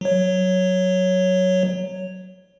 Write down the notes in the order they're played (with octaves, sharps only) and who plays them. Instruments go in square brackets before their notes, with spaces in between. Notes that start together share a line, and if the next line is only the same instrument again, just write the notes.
[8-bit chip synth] F#3 C#5